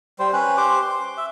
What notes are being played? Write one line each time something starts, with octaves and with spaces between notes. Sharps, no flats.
G3 C5
C#4 B4
G4 C5 D6
C6
E5